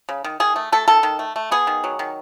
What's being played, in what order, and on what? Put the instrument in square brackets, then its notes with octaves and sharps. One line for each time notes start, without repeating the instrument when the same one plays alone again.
[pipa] C#3
D#3
D#3 G#4
A3
A3 A4
D#3 A4
D#3
A3
A3
B3 G#4
D#3
F#3
D#3